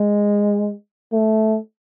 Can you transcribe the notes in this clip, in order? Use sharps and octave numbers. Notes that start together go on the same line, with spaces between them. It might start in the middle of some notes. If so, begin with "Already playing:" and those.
Already playing: G#3
A3